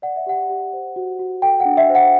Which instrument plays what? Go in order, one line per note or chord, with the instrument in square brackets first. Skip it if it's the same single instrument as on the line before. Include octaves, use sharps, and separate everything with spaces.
[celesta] D5 F#5
E5
G4 F#5
G4
C5
F#4
F#4
A4 G5
F#5
D4
E5
C5
F#5